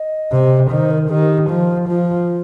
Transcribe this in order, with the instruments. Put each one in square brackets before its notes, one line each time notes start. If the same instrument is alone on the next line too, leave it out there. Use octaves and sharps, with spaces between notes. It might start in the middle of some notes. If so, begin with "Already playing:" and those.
Already playing: [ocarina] D#5
[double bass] C3
[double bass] D#3 [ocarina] C5
[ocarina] A#4
[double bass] D#3 [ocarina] G4
[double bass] F3 [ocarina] F4
[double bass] F3 [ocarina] F4